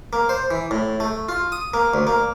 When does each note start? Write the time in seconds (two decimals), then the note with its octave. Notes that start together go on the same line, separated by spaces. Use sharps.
0.13 A#3
0.29 C5
0.51 E3
0.71 A2
1.00 A3
1.29 F4
1.52 D#6
1.74 A#3
1.94 D2
2.07 A#3